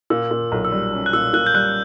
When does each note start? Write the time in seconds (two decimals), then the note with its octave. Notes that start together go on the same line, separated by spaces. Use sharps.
0.10 A#2 E6
0.31 A#2
0.52 B1
0.65 E6
0.72 G3
0.93 C#4
1.06 F#6
1.13 A#2 E6
1.33 A#2 F#6
1.46 G6
1.54 G3 F#6